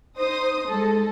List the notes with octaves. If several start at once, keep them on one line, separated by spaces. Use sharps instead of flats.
D#4 C5 D#6
G#3 A4